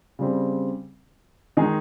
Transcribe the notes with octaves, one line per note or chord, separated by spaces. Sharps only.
C#3 G3 C4
D#3 G#3 D#4 G#4